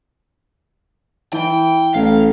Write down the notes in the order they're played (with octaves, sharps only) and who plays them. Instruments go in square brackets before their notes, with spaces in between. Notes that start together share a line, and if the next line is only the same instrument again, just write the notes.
[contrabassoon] E3 [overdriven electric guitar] G5
[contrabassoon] A1 [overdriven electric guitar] F5